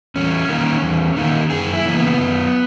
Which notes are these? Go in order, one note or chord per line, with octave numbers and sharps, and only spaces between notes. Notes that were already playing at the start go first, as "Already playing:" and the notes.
E2 C#4
D#3 A#3
E2
D#3 A#3
F#2 G#4
E4
C#3 E3 A#3 C#4
B3
F#2